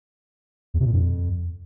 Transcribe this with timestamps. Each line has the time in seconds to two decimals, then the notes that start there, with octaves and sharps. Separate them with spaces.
0.74 E2
0.80 C3
0.86 A#2
0.92 F2